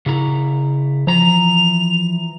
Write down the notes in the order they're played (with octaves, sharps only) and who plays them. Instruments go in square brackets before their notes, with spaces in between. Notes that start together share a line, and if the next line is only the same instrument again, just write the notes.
[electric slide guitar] C#3 E4 A#5
[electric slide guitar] E3 A#5 [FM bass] F3 [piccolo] F7